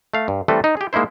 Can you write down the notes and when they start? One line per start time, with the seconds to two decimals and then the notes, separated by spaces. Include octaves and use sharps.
0.14 A3 F5
0.28 G2
0.48 E3 G3 A3 C4 A4 B4
0.64 D#4
0.77 G4 G#4
0.93 G#3 A#3 D#4 E4 C5